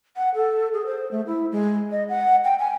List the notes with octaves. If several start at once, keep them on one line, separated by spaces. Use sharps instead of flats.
F#5
A4
G#4
C5
A3
E4
G#3
D#5
F#5
G5
G#5